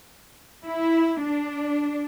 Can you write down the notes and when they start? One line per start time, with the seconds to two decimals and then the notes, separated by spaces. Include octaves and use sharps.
0.66 E4
1.24 D4